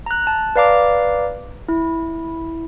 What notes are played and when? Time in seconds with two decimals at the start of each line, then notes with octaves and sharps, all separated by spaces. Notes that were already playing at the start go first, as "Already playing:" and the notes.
0.06 A#5 F#6
0.27 A5
0.56 B4 D5 F5 A#5 D6
1.69 E4